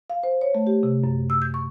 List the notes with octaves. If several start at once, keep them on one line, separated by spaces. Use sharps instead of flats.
F5
C5
C#5
A3
G4
C3
F#2
E6
G6
C#6